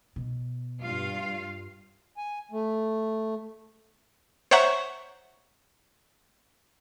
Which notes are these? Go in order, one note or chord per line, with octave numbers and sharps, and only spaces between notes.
B2
G2 F4 F5
G#5
A3
C5 C#5 E5 F#5 A#5 C#6